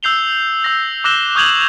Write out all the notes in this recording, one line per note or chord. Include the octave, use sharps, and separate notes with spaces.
E6 G6 C7 F7 G7
E6 A#6
D6 E6 F#6 A#6 E7 G7
C#6 D#6 G6 G#6 F7 F#7